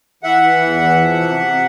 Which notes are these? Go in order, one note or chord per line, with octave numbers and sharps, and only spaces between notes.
E3 E5 F#5
E3
E2
E3
F3
C3
C3